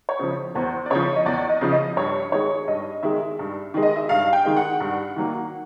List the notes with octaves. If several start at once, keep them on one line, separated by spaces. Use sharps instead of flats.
C#5
C#3 F3 C5
E2 C5
D5
C#3 F3 C#5
D#5
E2 D5
D#5
C#3 F3
D#5
G2 C#5
D#3 G#3 C#5
G2 D#5
D#3 G#3 E5
G2
D#3 G#3
D#5
E5
G2 F5
G5
D#3 G#3
F#5
G2
D#3 F#3 A#3